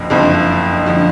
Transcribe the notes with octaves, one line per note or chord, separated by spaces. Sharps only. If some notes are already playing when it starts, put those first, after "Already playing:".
Already playing: F#1 F2 D3 F3
F#1 F2 D3 F3
D3 F3